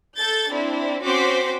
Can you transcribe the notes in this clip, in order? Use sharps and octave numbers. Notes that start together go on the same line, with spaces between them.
A4 G6 A6
C4 D4 E4
C4 C#4 F#4 C5 D6 B6